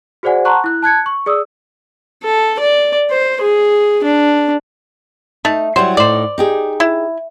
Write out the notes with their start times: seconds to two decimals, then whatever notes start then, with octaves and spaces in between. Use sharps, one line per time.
0.23 F#4 G#4 C5 D5 F#5 G#5
0.45 F#5 A5 A#5 C6 C#6 F#6
0.64 E4 F#6
0.82 A5 F#6 G#6 C#7
1.06 C#6
1.26 G#4 D5 D#6 E6
2.24 A4
2.59 D5
3.10 C5
3.41 G#4
4.04 D4
5.45 A3 D#4
5.76 F#3 G3 E4 C5
5.97 A2 D#4 C5 D5
6.38 D#4 G4 G#4
6.80 E4